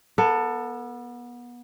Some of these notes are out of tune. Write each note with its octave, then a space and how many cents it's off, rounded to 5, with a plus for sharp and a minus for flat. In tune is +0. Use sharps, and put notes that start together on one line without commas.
B3 -30 A4 +20